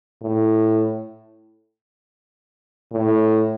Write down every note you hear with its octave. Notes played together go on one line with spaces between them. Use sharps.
A2
A2